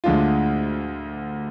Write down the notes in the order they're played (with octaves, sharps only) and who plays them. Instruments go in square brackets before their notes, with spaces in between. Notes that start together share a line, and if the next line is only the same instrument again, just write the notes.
[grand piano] D2 D3 G#3 D4 F4